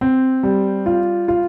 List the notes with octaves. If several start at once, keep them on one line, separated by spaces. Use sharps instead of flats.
C4
G3
F4
F4